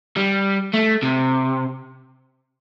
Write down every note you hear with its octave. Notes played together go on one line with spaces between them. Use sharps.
G3
A3
C3